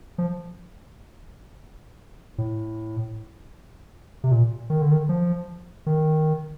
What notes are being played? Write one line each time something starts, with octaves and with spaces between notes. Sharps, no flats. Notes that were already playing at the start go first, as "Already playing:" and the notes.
F3
A2
C3
A#2
D#3
D3
D#3
F3
D#3